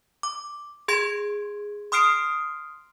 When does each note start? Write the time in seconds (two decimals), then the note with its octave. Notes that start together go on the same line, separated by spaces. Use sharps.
0.23 D6
0.88 G#4 C6 G#6 D7
1.92 C6 D#6 F6 C7 D7